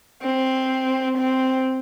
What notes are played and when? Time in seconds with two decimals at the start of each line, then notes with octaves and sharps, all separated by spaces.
0.22 C4
1.18 C4